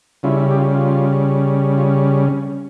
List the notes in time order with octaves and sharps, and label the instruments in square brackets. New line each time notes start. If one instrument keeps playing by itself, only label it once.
[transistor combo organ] C#3 G3 C#4 E4 F4
E4
G4
F4
F4
F4